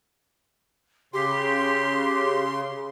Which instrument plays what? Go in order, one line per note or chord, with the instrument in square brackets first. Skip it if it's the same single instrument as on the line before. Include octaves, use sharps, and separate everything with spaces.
[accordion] C#3 C6 [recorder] G4